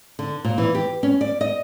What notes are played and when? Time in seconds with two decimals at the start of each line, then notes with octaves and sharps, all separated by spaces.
0.19 D3
0.44 A#2
0.58 E3
0.75 G4
1.03 C#4
1.21 D5
1.41 D#5